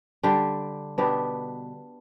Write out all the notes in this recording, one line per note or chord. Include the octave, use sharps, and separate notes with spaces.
D3 G3 D4 G4
B2 B3 D4 G4